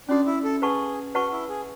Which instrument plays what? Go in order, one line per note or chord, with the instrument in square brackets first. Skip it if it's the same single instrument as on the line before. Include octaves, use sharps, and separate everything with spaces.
[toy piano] C#4 F#4 A4 [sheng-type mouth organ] D4
[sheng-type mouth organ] E4
A4
[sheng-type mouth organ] G#4 [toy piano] B4 F#5 A5 C#6
[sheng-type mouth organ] F#4 [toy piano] B4 F#5 A5 C#6
[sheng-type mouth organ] E4
G#4